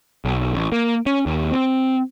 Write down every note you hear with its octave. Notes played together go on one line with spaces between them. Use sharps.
B1
A1
A#3
C#4
D#2
C4